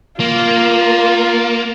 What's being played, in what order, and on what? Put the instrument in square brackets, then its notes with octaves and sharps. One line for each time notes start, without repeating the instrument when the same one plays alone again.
[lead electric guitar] A#3 [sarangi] F4